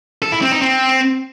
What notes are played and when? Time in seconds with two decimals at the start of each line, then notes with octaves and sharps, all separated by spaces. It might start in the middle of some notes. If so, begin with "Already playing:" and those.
0.22 A4
0.32 E4
0.42 C4
0.51 D#4
0.61 C4